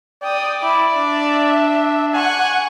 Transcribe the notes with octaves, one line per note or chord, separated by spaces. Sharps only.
D5 G5 D#6
E4 D6
D4 E5
F#5 G#5 C#6